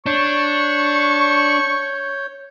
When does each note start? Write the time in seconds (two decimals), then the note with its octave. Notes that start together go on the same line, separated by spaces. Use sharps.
0.06 D4 C#5 C#6 G6